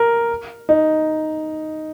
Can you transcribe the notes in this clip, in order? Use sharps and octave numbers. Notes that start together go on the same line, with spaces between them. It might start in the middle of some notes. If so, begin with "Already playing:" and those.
Already playing: A#4
D#4